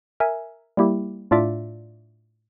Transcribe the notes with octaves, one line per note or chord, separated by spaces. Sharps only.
A#4 E5 G#5
G3 A#3 E4 G4
A2 D4 F4 D5 E5 D6